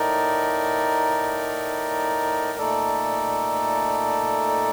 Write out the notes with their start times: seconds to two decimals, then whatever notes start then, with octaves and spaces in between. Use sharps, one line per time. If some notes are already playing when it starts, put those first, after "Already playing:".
Already playing: A2 A3 D#4 A#4 D5
2.58 A#2 A3 D#4 A4 D5